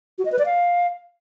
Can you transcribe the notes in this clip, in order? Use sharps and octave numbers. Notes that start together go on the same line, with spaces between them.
F#4
D#5
B4
D5
F5